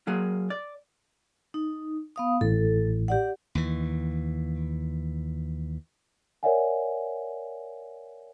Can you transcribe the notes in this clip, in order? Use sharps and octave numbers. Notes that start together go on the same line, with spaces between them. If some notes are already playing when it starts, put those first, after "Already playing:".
F#3 A#3 G#4
D5
D#4
B3 F5 D#6
A1 A2 A4
G4 D5 F#5
D#2 E3
A#4 C#5 D5 E5 F#5 G#5